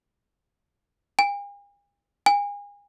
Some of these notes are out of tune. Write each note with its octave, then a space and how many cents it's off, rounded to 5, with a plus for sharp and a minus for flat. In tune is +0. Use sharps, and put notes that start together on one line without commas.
G#5 -45
G#5 -35